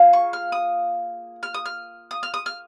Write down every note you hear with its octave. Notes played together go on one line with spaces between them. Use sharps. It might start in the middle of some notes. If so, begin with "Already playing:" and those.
Already playing: A#3 F4 G#4
C#6
F6
D#6
F6
D#6
F6
D#6
F6
D#6
F6